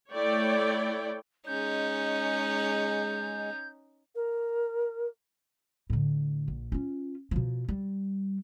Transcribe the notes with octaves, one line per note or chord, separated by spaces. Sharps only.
A3 E4 C#5 D5 G5
G#3 C#4 D#4 G6
A#4
A2 D3
A#1
C#4 F4
B2 F3
G3